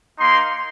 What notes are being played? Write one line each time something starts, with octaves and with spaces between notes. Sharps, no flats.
A#3 D#4 C6